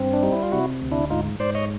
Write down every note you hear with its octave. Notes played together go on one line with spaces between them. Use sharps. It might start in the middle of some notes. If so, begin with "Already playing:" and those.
Already playing: G2 C4
D4
G3 D#4
E4
F4
C3 E4 F#4
D2
D4 E4
G#2 D#4 F4
G#2 C5 D5
C#5 D#5